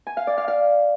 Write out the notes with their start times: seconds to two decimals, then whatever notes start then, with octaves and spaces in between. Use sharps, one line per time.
0.07 G#5
0.17 F5
0.27 D5
0.38 F5
0.48 F5